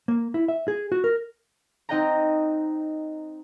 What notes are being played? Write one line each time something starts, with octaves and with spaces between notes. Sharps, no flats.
A#3
E4
E5
G#4
F#4
A#4
C4 D#4 D#5 F#5 G5 A#5